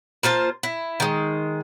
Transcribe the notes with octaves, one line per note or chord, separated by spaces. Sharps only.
A#3 F4 C5 A5
E4
D#3 G#3